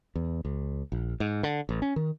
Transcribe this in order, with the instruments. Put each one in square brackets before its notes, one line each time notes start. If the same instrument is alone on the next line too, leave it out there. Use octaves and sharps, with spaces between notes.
[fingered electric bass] E2
C#2
A#1
G#2
D3
A1
C#4
D#3